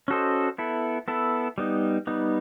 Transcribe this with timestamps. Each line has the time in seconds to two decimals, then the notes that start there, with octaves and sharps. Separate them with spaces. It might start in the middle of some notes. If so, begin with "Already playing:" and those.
0.08 C#4 F#4 A4 C5 D#5
0.58 B3 E4 A4
1.08 B3 E4 A4
1.58 G3 B3 D#4
2.07 G3 B3 D#4